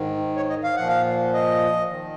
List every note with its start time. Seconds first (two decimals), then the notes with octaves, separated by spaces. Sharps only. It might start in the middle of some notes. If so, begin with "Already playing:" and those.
Already playing: G#2 D#3
0.37 C#5
0.50 D#5
0.63 F5
0.76 A#2 F3 F#5
0.88 F5
1.34 D#5
1.90 D#3